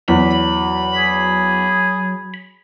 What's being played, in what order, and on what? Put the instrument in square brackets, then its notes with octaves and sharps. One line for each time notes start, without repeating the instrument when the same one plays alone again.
[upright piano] E2 [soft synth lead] F#3 [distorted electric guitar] B5
[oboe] G#4